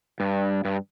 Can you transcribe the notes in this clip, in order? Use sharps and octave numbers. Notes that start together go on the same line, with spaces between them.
G2
G2